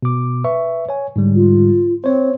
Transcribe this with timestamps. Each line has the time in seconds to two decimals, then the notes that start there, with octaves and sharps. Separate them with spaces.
0.02 B2 D6
0.44 B4 E5 C#6
0.89 C#5 G#5
1.16 G#2 D3 G3
1.34 F4
2.04 C4 C5 C#5